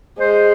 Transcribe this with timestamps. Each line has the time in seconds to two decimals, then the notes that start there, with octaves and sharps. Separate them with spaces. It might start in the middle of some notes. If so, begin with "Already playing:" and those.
0.19 G#3 C5